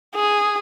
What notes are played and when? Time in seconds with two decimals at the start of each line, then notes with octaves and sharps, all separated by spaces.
0.15 G#4